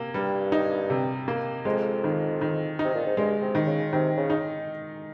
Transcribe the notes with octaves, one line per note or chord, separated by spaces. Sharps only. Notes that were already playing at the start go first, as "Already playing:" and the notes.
Already playing: C3 A#3
G2 G3
D#4
C3
A#3
F2 G#3
D#3
D#3
C3 D#4
A#2
G#2
G2 G#3
C3
D#3
C#3
C3 D#3
C#3
D#4